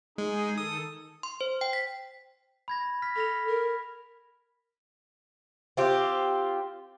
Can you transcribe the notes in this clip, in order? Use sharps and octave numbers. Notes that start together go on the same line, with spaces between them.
G#3 D#4 G#4
D#3 A4 D#6
C6
C5
G5
B6
B5 G#6 A#6
F6 A#6 B6
A4 B5 A#6 F7
A#4
C4 F4 G4